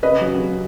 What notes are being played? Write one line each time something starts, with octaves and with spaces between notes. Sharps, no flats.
C#3 B4 D#5
F#3 C#4
C#3